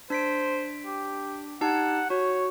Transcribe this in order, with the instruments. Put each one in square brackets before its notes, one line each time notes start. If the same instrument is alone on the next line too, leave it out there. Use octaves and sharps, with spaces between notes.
[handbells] D4 B6 D7 [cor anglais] C5
[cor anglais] G4
[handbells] D#4 G4 A5 [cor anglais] F#5
[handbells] F#4 [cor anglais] C#5